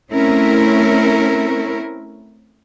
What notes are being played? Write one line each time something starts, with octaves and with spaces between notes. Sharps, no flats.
A3 C4 C#4 E4 A#4